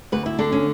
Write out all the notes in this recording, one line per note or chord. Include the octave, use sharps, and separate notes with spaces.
D2 B4
E4
D3 D4
C#4